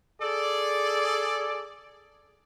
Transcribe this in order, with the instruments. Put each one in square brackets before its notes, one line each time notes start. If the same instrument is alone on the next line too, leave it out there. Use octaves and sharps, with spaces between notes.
[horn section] G#4 A4 D5